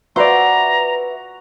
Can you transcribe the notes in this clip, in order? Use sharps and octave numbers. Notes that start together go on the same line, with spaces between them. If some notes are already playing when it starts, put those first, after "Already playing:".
F#4 B4 C5 D5 E5 A#5